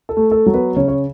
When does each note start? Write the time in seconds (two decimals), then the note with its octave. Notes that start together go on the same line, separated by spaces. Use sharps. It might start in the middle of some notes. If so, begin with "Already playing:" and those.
0.09 A4
0.17 A3
0.31 A4
0.46 F#3
0.54 B3 B4
0.76 C#3 C#4 C#5
0.88 C#5